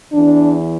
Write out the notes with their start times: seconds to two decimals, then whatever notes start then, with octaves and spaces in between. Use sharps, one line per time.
0.13 E2 E3 D4